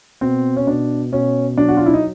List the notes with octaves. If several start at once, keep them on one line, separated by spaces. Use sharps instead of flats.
B2 C4
C#4
B2 D4
B2 C#4
F#3 D4
F#4
F4
E4
D#4